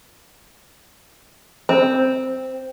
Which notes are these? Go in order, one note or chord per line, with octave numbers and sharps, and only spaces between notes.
C4